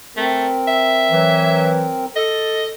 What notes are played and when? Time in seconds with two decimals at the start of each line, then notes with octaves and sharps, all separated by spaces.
0.17 A3 C4 A#4
0.67 E5
1.11 E3 F#3
2.16 A4 D#5